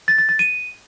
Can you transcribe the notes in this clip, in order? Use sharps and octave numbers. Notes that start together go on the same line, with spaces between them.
A6
A6
A6
D#7